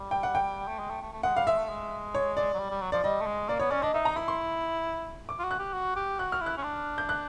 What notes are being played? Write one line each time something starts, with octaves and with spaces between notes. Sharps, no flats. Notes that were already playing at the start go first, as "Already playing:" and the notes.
Already playing: G3
G5
F#5
G5
A3
G#3
A3
A3
A3
G#3 F#5
G3 F5
G#3 E5
A3
G#3
C#5
D5
F#3
G3
G3
F#3
F3 D5
G3 D#5
A3
G#3
A#3 D5
B3 C#5
C#4 D5
D4 D#5
D#4 E5
A#5
E4 B5
C6
D6
F4
F#4
F#6
G4
F#4
G4
F#4 F#6
F6
E4
F#6
C#4
D4
G6
F#6